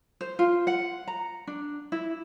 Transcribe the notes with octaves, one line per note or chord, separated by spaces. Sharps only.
C5
F4
F#5
A#5
D4
E4